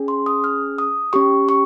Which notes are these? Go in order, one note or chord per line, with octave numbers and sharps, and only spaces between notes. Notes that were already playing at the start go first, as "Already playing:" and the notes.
Already playing: C#4 G#4
C6
D#6
F6
D#6
C#4 G4 C#6
C#6